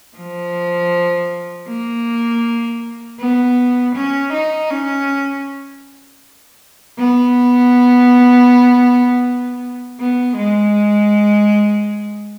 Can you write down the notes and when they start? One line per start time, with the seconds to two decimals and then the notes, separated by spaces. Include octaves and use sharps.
0.17 F3
1.69 A#3
3.19 B3
3.95 C#4
4.33 D#4
4.70 C#4
6.98 B3
10.00 B3
10.36 G#3